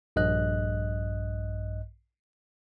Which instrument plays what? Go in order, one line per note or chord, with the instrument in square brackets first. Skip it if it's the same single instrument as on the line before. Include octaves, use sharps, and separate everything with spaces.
[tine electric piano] A#1 G2 D#5 F#6